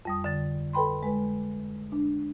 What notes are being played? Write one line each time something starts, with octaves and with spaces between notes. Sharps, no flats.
F2 G3 D#6
D3 A6
A4 B4 G5 B5 C6
G#3 B4
D4